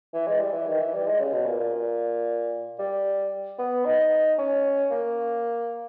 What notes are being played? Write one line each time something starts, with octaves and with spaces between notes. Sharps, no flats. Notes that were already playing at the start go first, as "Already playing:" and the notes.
E3
G#3
G3
E3
D#3
E3
G3
G#3
C#3
B2
A#2
A#2
G3
B3
D#4
C#4
A#3